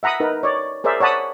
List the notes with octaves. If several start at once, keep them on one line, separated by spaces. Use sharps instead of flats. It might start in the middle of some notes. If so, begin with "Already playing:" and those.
E5 F#5 A#5 B5 D#6
D#4 A#4 B4
C#5 D5
G#4 A#4 C5 D5 E5
C#5 D5 F#5 A5 B5 D#6